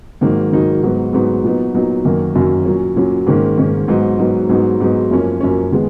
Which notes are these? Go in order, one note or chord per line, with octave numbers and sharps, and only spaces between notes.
G#2 D#3 F#3 A#3 D#4
G#2 D#3 F#3 A#3 D#4
G#2 F#3 B3 D#4
G#2 F#3 B3 D#4
A#2 F#3 B3 D#4
A#2 F#3 B3 D#4
F#2 D#3 F#3 A#3
F#2 D#3 F#3 A#3
A#2 F#3 C#4
A#2 F#3 C#4
G#2 D#3 A#3 C#4
G#2 D#3 A#3 C#4
G#2 F#3 B3 D#4
G#2 F#3 B3 D#4
G#2 F#3 B3 D#4
G#2 F#3 B3 D#4
F#2 F3 A#3 C#4
F#2 F3 A#3 C#4
D#3 G#3 B3